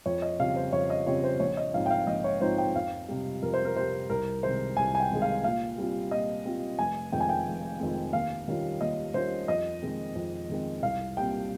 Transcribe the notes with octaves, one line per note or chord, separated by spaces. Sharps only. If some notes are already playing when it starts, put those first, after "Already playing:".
F2 C#5
D#5
C#3 G3 C4 F4 F5
C5
F2 C#5
D#5
C#3 G3 C4 F4 C#5
C5
A#1 C#5
D#5
G#2 F3 C4 D#4 F5
G5
F5
A#1 D#5
C#5
G#2 F3 C4 D#4 C5
G5
F2 F5
C3 G3
F2 A#4
C5
A#4
C3 G3 C5
C2 A#4
C3 D#3 G#3 C5
C2 G#5
G#5
G5
C3 D#3 G#3
F5
A#2 F5
G3 C4 F4
A#2 D#5
G3 C4 F4
F1 G#5
F2 D#3 G#3 C4 G5
G#5
G5
F1
F2 D#3 G#3 C4
D#2 F5
D#3 G3 C#4 F4
D#2 D#5
D#3 G3 C#4 F4 C5
F2 D#5
D#3 G#3 C4
F2
D#3 G#3 C4
C2 F5
A#2 G3 C4 G5